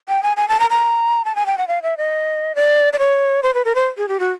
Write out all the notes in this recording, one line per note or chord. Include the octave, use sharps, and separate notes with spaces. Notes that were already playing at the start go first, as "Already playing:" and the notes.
G5
G#5
G#5
A5
A#5
A#5
A5
G#5
G5
F#5
F5
E5
D#5
D5
D5
C#5
C5
B4
A#4
C5
G#4
G4
F#4